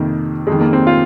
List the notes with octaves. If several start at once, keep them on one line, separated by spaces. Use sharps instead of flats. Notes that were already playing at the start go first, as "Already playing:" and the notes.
Already playing: F2 C3 D#3 A#3
F2 D#3 G#3
A#3
C4
F4